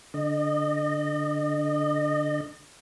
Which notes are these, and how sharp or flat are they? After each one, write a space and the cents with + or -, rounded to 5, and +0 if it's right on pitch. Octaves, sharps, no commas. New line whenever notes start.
D3 +0 D#5 -35